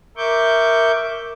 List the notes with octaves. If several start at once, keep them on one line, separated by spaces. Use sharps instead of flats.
A#4 E5 C#6 D6 G6